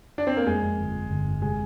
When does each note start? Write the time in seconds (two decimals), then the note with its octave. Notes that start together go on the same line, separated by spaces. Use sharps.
0.18 D4
0.27 C4
0.37 A#3
0.47 F2 G#3
0.62 F2
0.79 G1
0.95 G1
1.10 G1
1.26 F2
1.42 C3 G#3